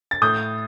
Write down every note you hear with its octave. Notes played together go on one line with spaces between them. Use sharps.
A6
A2 D#6 G6